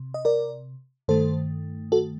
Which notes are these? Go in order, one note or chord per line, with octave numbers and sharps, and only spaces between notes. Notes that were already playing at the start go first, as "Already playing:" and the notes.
Already playing: C3
D#5
A#4 D5
G2 D#3 A3 A4 C5
F#4 A4